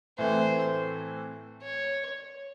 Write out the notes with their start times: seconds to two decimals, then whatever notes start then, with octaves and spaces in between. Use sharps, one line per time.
0.18 A2 E3 A3 C4 C5
1.63 C#5